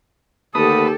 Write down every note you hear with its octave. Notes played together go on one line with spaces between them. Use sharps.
D#2 D3 A3 G4 A4 B4 D#6